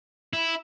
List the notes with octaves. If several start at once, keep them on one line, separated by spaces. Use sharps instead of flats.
E4